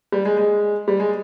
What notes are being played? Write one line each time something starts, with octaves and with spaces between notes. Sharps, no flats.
G3
G#3
G#3
G3
G#3